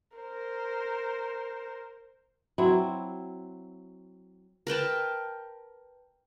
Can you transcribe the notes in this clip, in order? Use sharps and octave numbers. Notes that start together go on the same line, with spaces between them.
A#4 C5
F#3 C4 E4
A#4 B4 G5 A5